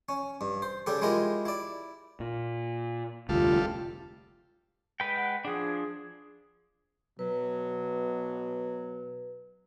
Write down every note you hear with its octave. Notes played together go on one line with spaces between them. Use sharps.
C#4
G2
C5
C#3 G3 G4 A4
G#3 E4 F4 G4 A#4
E4 D5
A#2
F1 D2 G3 F4 A4 F5
G#3 B4 G5
F#5
F3 D4 G#4
B2 F#3 B4